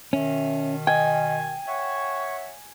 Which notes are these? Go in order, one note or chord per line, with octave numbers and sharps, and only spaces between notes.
B2 D#3 C#4 E5
D#5 G5 G#5
C#5 E5 F#5 C#6